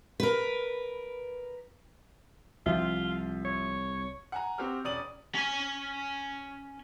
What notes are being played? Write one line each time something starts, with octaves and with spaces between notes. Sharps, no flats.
A#4 B4
C2 F3 F4 E5
C#5
F#5 G#5 A#5
C4 F#4 G4 F6
E1 C#4 D5 D#6 D#7 F#7
C#4 G#5